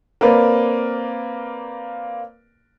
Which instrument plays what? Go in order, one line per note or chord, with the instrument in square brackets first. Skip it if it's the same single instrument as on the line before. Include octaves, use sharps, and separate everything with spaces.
[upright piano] A#3 C4 A#4 B4 D5